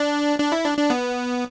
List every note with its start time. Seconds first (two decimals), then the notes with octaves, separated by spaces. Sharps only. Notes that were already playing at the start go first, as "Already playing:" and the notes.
Already playing: D4
0.39 D4
0.52 E4
0.65 D4
0.78 D4
0.90 B3